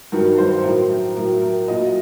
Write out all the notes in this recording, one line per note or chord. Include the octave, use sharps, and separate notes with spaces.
G2 D#3 F#3 A#4
C5
A2 F#3 A#4
A2 F#3 A#4
A#4
A#2 F#3 D#5